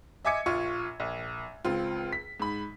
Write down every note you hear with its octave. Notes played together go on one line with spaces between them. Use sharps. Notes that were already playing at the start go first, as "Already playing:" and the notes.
D#5 E5 G#5 D6 G#6 C#7
A#1 F4 C#6
A#1
C#2 C4 F4
B6
G#2 B5